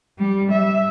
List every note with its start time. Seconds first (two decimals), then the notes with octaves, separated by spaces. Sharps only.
0.18 G3
0.51 E5